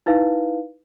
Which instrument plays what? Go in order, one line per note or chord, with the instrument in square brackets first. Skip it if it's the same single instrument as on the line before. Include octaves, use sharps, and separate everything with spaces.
[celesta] D#4 E4 B4 F5